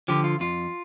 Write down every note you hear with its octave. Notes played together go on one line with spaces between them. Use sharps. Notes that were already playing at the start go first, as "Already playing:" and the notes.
D3 F3 G4
F4
F2 F4